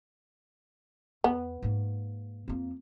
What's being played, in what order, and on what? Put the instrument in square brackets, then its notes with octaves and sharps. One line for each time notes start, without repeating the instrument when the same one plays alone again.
[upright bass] E2 [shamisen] B3
[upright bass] G#2 A#3
F2 A#3